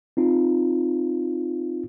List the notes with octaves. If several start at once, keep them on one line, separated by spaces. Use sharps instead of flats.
C4 D#4 F4